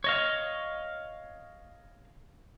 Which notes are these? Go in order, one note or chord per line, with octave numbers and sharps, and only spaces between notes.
C#5 D#5 F5